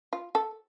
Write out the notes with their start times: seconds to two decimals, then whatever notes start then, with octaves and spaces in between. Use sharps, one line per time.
0.13 F4
0.35 A4